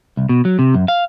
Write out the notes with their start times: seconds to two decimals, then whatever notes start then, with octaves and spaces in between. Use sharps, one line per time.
0.17 C2
0.29 B2
0.45 F#3
0.59 C3
0.74 F#2
0.88 F5